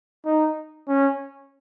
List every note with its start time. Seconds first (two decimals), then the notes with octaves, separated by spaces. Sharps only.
0.25 D#4
0.88 C#4